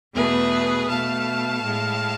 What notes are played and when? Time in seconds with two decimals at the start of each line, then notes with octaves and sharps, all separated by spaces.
0.14 E2 B2 A3 G#4 B4
0.88 B2 A3 F5 A5
1.63 A2 G#3